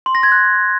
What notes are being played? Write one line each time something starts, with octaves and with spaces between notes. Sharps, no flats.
C6
A#6
G#6
F#6